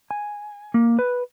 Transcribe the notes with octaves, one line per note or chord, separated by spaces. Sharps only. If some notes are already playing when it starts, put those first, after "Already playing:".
G#5
A#3
B4